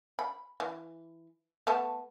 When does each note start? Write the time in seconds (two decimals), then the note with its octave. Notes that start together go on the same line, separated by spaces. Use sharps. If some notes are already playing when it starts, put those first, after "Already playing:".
0.19 B5
0.60 E3
1.67 A3 B3 A5